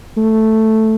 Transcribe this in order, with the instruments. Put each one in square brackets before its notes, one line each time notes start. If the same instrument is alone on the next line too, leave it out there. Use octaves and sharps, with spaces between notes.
[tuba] A3